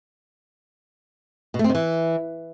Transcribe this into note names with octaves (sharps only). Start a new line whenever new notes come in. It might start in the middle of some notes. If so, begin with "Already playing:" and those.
B2
A3
C4
D#3
E3